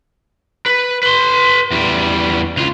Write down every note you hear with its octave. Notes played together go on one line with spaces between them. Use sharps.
B4
B4 C6
E2 G3
C#2 F4